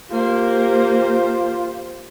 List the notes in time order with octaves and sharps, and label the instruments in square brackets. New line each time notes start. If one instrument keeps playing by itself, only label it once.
[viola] A#3 [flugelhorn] F4 [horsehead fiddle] G4 C5